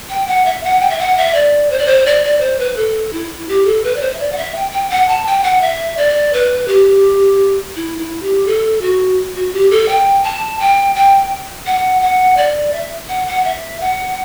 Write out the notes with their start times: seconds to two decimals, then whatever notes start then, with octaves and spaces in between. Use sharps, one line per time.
0.10 G5
0.27 F#5
0.46 E5
0.64 F#5
0.81 G5
0.90 E5
0.99 F#5
1.17 E5
1.34 D5
1.70 C5
1.79 D5
1.86 C5
2.06 D5
2.24 D5
2.41 C5
2.59 B4
2.77 A4
3.13 E4
3.48 G4
3.65 A4
3.84 B4
3.96 D5
4.01 C5
4.14 E5
4.20 D5
4.32 F#5
4.37 E5
4.55 G5
4.72 G5
4.90 F#5
5.09 A5
5.26 G5
5.44 F#5
5.61 E5
5.97 D5
6.33 B4
6.68 G4
7.76 E4
7.98 E4
8.22 G4
8.47 A4
8.81 F#4
9.35 F#4
9.53 G4
9.71 A4
9.88 G5
10.24 A5
10.59 G5
10.95 G5
11.66 F#5
12.02 F#5
12.37 D5
12.73 E5
13.09 F#5
13.27 F#5
13.44 E5
13.80 F#5